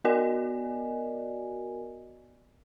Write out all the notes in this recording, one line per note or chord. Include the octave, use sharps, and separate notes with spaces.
B3 F#4 A#4 D5 D#5 G#5